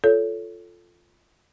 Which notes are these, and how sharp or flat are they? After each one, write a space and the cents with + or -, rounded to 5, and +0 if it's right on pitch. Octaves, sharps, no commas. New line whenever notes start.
F4 +0 A4 +0 C#5 +20